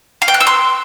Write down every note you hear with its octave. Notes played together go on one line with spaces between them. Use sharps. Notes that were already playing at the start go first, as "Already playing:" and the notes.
F5
G5
F#6
E6
C6